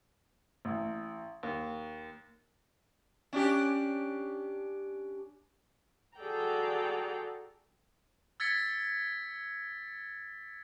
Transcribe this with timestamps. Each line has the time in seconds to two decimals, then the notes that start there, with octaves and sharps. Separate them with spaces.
0.65 A1
1.43 D#2
3.33 C#4 D4 G4
6.18 F#4 G#4 A4 D5 G5 A#5
8.40 E6 G#6 A6 B6 C#7